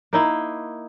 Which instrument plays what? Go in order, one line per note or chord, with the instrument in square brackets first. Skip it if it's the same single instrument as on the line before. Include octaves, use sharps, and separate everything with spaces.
[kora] A#3 D#4 E4